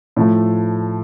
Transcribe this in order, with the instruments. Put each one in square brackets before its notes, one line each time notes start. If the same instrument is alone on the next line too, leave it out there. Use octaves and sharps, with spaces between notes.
[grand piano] A2 F3 A3